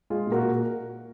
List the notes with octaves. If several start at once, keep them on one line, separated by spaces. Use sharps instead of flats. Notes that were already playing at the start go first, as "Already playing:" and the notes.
G#3 F4 G#4
A#2
F#4 A#4
A#2